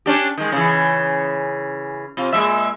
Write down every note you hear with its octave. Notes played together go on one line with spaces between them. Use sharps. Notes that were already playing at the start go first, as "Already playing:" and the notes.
C#4 D4 G4
D#3 G#3
C#3 E3
C3 F4
A#2 G#3 E5